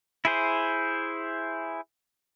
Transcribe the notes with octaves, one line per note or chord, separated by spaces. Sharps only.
E4 G#4 C5